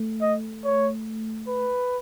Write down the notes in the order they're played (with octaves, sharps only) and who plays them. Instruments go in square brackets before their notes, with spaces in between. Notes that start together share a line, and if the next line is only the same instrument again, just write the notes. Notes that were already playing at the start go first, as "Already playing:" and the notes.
Already playing: [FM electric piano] A3
[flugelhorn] D#5
C#5
B4